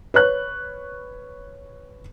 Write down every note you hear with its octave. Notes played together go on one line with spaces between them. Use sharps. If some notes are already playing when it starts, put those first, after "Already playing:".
B4 C#5 F#6